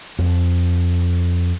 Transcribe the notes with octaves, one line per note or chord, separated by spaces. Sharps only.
F2